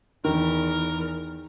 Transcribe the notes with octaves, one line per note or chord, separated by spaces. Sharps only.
E2 D#3 A#4